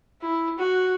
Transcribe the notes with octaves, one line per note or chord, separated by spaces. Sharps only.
E4
F#4